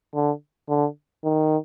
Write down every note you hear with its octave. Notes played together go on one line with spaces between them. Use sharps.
D3
D3
D#3